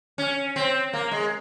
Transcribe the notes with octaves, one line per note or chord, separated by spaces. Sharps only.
C#4
C4
A#3
G#3